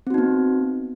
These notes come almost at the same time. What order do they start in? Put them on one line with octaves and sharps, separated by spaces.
C4 F#4 D#4 B3